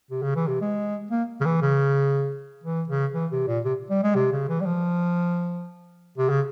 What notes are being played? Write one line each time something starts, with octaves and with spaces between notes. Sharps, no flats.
C3
C#3
E3
C3
G#3
A#3
C#3
E3
C#3
E3
C#3
E3
C3
A#2
C3
G3
G#3
C3
C#3
E3
G3
F3
C3
C#3